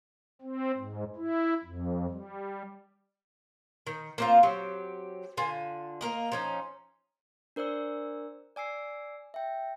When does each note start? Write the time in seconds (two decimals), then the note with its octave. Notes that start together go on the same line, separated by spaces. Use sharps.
0.41 C4
0.77 G#2
1.16 E4
1.64 F2
2.10 G3
3.87 D#3
4.18 A#3 C4 F4
4.43 F#3 C4 G4
5.37 D3 F4 G#5
6.01 A#3 A#4 D#5
6.32 F3 C#4 D#4
7.56 D4 A#4 C5 D5 E6
8.56 D5 G#5 E6 C7
9.34 E5 G5